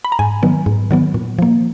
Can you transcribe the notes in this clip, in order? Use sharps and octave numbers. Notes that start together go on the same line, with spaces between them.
B5
A#5
G#2 G#5
D#3 F#3 B3
G#2
D#3 F#3 B3
A#2
F3 A#3